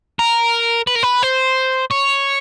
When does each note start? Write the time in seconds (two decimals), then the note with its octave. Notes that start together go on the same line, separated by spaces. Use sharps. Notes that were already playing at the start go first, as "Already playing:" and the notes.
0.19 A#4
0.87 B4
0.95 A#4
1.03 B4
1.22 C5
1.91 C#5